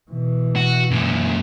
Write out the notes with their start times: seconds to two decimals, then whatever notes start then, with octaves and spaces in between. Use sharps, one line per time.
0.11 B2 E3
0.56 F#4
0.91 F#2 A#2